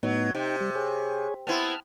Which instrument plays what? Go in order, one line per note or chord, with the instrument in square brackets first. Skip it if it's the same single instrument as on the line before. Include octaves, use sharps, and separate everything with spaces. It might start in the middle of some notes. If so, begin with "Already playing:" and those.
[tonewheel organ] A2 B3 D#4 [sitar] F#3
[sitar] C3 [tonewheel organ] D#4 G5
[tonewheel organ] G3
G#4 C#5
[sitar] B3 C4 E4 [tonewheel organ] A5 F6